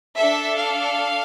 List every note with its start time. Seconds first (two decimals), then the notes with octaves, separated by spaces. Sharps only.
0.16 D4 A4 E5
0.57 F5